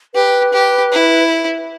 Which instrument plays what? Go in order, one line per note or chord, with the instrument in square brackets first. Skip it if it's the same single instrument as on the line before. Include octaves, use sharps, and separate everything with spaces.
[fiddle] G4 [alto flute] B4
[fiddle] G4
E4